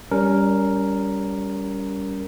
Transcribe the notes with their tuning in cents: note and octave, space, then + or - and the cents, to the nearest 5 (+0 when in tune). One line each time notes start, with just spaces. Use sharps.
G3 +0 C#4 +30 A#4 +0